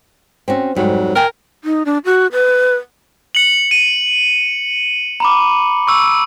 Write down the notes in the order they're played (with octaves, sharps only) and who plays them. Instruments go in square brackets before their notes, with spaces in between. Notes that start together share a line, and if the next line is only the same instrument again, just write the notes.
[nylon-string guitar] C4 C#4 F#4
[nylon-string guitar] F2 G#2 G3 [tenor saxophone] F#3
[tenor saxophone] A#4 [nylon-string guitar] F5 G5 G#5
[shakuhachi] D#4
D4
F#4
B4
[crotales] C#7 F#7
D#7
[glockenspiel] A#5 B5 D6
[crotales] C#6 E6